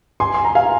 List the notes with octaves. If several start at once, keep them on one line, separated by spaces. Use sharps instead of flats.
G#5 C6
C6
A#5
F5 G#5